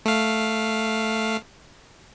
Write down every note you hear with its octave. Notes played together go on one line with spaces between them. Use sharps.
A3 F5